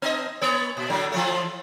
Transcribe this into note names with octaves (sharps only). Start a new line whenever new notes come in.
B3 D#5
A#3 C#5
A#2
A2 D3 F#3
E3 F3 A3